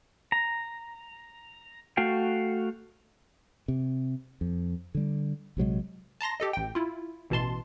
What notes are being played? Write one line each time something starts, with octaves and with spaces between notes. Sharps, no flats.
A#5
A3 F#4 F5 G5
C3
F2
D3 G3
A#1 C3 F#3 G#3
A5 A#5 C6 A#6
G4 A4 D#5
A1 G5
E4 F4
A1 B2 E3 A5 C6